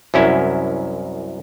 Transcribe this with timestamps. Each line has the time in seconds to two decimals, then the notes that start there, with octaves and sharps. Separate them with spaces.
0.14 C2 F#2 C#4 E4